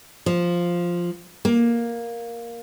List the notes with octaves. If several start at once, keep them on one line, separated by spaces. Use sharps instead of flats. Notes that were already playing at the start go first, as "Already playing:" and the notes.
F3
A#3